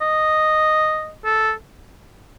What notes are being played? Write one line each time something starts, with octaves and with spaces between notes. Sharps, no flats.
D#5
A4